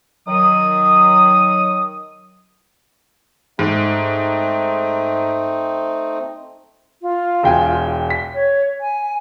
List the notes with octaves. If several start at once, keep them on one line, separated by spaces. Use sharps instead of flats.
D#3 F#3 D#6
G#2 A3 C4 D#4
F4
E1 G5 G#5
B6
C#5
G#5